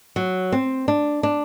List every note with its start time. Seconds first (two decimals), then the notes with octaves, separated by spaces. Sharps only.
0.16 F#3
0.52 C4
0.88 D4
1.23 D4